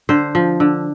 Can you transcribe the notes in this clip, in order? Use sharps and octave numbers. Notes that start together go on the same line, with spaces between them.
D3 C5
F3
D3